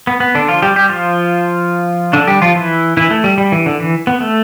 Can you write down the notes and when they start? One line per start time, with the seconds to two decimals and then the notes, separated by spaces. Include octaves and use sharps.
0.07 B3
0.20 B3
0.35 D3 D4
0.49 F3 F4
0.62 G3 G4
0.76 G3 G4
0.89 F3 F4
2.13 D3 D4
2.28 G3 G4
2.42 F3 F4
2.55 E3 E4
2.97 E3 E4
3.11 A3
3.24 G3
3.38 G3
3.52 E3
3.66 D3
3.80 E3
4.07 B3
4.21 A3